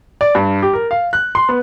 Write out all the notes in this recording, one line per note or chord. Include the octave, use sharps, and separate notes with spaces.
D5
G2
G4
A#4
F5
F#6
C6
B3